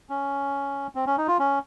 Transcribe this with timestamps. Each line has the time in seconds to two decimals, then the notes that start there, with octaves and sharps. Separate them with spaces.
0.09 C#4
0.95 C4
1.06 C#4
1.18 D#4
1.28 F4
1.39 C#4